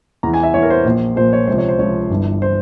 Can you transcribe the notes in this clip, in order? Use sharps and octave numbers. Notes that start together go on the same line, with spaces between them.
E2 E3 A#5
G#5
E5
E2 E3 C#5
A#4
C5
A#1 A#2 F3
A#1 A#2 F3 C5
C#5
C#2 C3 F3 C5
C#5
C5
C#2 C3 F3 C#5
G1 G2 E3
E3 C5